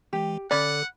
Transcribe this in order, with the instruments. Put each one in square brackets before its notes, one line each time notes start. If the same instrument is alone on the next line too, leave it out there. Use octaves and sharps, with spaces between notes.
[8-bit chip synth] E3 G#3 [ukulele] G4
[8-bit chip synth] D3 A4 [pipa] C#4 D5 [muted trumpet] F#5 [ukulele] B5